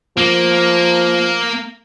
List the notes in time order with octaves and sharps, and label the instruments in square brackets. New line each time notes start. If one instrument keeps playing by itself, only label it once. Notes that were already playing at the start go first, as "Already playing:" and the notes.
[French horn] F3 [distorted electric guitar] A#3